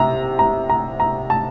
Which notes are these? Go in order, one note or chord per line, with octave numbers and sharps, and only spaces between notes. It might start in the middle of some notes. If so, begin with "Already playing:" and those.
Already playing: C3 A#5
A#5
A#5
A#5
A5